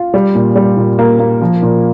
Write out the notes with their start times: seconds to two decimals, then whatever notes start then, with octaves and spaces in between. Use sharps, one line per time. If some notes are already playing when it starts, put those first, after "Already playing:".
Already playing: F4
0.14 G3
0.35 A#2
0.56 G3
0.77 A#2
0.99 A#3
1.20 A#3
1.41 F3
1.62 A#2